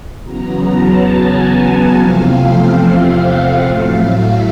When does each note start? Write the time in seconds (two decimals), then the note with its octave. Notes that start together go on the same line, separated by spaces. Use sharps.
0.23 E2 C#3 F#3 B3 A#5
0.65 A5
1.07 G#5
1.48 F#5
1.90 E2 C3 F3 A3 C4 F5
3.16 F#5
3.58 A2 F#3 A3 F5
4.01 E5